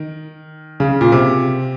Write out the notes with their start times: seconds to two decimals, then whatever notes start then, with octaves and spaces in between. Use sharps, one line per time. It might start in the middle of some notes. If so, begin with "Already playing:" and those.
Already playing: D#3
0.80 C#3
1.01 A#2
1.12 C3